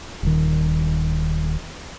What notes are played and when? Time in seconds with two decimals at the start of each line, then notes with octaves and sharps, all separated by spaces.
0.23 D#1 D#3